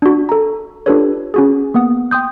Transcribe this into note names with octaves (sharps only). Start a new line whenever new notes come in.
D4 F#4
A4 A#5
D4 F4 G4 A4 B4 C#5
C#4 F#4 G#4
A#3 B3 F#5 D#6
G5 C6 D#6 G6